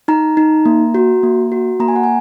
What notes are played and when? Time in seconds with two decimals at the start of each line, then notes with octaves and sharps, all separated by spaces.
0.08 D#4 A#5
0.37 D#4
0.65 A#3
0.94 F#4
1.23 A#3
1.52 F#4
1.80 A#3 A#5
1.88 G#5
1.96 F#5
2.04 G#5